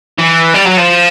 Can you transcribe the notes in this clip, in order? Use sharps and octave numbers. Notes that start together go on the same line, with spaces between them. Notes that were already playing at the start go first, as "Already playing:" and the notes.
E3
G3
F#3
F3